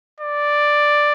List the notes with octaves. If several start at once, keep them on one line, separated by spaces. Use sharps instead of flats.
D5